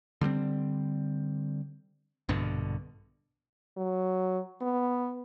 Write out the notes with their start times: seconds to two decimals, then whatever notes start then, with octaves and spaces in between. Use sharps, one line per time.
0.21 D3 G3 B3 C4
2.29 A#1 G2 B2 D3
3.77 F#3
4.61 B3